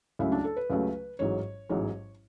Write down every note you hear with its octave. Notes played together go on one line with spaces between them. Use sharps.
C#2 C#3 F#3 A3 E4
D4
A4
B4
C#2 C#3 F#3 A3
A1 G#2 F#3 C#5
A1 G#2 F#3